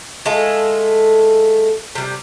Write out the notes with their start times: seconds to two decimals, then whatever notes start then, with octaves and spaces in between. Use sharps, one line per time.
0.26 G#3 A3 F4 A4
1.95 C3 G3